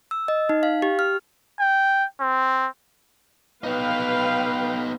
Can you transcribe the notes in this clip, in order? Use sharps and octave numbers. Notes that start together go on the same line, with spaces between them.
E6
D#5
D#4
F5
G4
F6
G5
C4
B3 D#4 B4 F5 G5